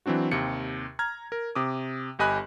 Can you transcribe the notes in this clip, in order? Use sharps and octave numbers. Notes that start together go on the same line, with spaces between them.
E3 F#3 C4 D4 F#4
D#2 C3 C#7
A#5 F6 G#6
A#4
C3 D6 D#6
G1 G4 D#5 G#5 B5 F#6